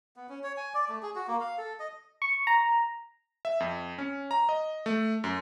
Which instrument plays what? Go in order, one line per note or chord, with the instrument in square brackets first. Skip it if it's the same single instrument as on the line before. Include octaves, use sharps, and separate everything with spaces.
[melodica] B3
C#4
C#5
G#5
D5
A3
G#4
F#4
A#3
F5
A4
D#5
[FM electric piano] C#6
A#5
[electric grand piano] E5
F2
C#4
A#5
D#5
A3
F#2